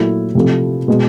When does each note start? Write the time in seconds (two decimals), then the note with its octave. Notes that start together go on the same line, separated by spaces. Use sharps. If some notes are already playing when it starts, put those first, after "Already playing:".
Already playing: A#2 F#3 A3 E4
0.35 C3 F3 A3
0.88 B2 G#3